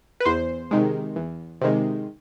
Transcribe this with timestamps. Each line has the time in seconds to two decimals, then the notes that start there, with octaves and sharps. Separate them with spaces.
0.20 B4
0.25 E2 C5
0.71 C3 D#3 G#3
1.16 E2
1.61 C3 D#3 G#3